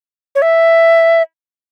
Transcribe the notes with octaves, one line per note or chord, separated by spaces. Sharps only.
C#5
E5